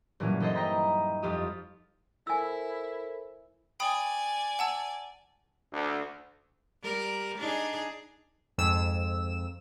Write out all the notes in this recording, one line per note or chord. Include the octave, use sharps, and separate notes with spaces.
G2 A#2 E3 F#3 C#4
E3 D#4 A4 C5 D#5
D#5 G5 A#5 B5
F2 F4 G4 D#6
E4 A4 A#4 C5 G#5 E6
D5 G5 G#5 B5 D#6
F#5 A5 E6
D2
G3 A#4
D4 D#4 G#4
F2 G#2 E6 E7